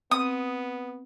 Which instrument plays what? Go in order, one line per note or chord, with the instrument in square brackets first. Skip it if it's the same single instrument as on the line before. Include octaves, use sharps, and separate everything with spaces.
[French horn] B3 [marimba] C4 [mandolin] D#6